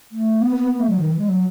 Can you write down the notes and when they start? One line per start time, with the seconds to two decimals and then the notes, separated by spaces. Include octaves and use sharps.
0.12 A3
0.41 B3
0.55 B3
0.70 B3
0.80 A3
0.89 F#3
0.99 D#3
1.09 E3
1.18 G#3
1.28 F#3